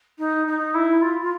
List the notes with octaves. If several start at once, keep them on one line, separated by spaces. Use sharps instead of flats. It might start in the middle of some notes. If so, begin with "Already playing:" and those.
D#4
D#4
E4
F4
F4